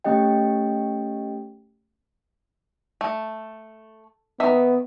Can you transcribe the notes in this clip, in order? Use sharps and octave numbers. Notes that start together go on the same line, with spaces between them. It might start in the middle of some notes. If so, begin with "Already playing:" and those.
A3 C#4 G4 D#5 G5
A3
D#3 B3 E5